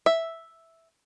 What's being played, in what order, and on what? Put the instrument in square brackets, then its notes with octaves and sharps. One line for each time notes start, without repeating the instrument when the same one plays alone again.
[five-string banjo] E5